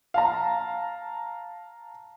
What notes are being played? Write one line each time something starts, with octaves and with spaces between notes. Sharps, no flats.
F5 A5 A#5